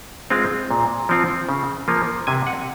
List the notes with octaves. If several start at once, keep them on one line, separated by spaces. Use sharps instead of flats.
G#3 C4 F4
A#2
F3 C4 F4
C#3
F3 A#3 F4
C3 G#5
F#5